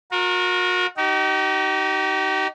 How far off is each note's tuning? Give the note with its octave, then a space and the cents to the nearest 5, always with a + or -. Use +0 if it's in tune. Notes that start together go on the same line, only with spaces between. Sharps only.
F#4 -40 A#4 +0
D#4 +0 G4 -40